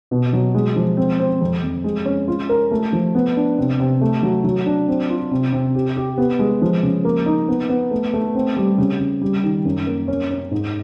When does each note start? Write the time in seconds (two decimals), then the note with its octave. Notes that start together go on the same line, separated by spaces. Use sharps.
0.11 B2
0.33 F#3
0.55 G#3
0.76 F3
0.97 C4
1.20 C4
1.41 F2
1.63 F2
1.84 G#3
2.05 C#4
2.28 F4
2.49 A#4
2.71 A3
2.93 F3
3.15 B3
3.37 D4
3.58 C3
3.80 C3
4.01 A3
4.23 F#3
4.44 F#3
4.66 D4
4.88 C4
5.10 F4
5.31 C3
5.52 C3
5.75 G4
5.96 G4
6.18 B3
6.39 G#3
6.62 F3
6.83 C#3
7.05 A#3
7.26 D#4
7.49 B3
7.69 B3
7.91 A3
8.13 A3
8.35 C4
8.56 G3
8.78 C#3
9.00 C#3
9.21 G3
9.44 D#3
9.65 F#2
9.87 A#3
10.08 C#4
10.31 C#4
10.51 G#2